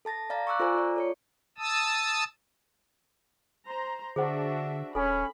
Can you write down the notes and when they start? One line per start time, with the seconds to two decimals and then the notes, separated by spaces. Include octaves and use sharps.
0.05 A4 A5 A6 A#6
0.30 D5 F5 A#5 A6
0.47 C#6 D6 E6 F#6
0.60 F4 A4 C5 D5 G#5 A#5
0.75 F4 D5
0.96 A4 C#5 C#7
1.58 A5 D#6 E6
3.67 C5 A#5
4.16 D3 D4 F#4 G#4 C5 E5 F#5
4.95 D#1 C#4 A4 G#5 B5